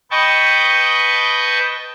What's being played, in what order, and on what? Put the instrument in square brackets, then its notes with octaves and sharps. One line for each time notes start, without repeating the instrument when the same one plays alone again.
[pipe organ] B4 D#5 G5 A5 C#6